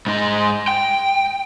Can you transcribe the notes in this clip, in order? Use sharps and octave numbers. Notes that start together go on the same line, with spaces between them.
G#2 D#4
G5